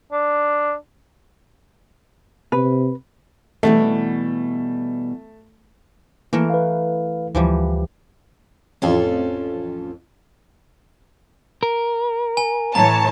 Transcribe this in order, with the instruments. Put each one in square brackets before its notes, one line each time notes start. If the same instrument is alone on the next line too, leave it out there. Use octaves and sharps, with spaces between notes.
[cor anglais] D4
[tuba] C3 [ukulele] B4
[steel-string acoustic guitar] B2 E3 G3 [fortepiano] A3
[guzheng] E3 A3 A#4 [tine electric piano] A#3
[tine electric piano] B4 F5
[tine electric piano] D2 [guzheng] E3 F3 G3
[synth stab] A1 F2 [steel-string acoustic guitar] C#4 F4 A4
[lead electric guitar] A#4
[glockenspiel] G#5
[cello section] A2 E3 C#5 [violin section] A5 [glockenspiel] A#5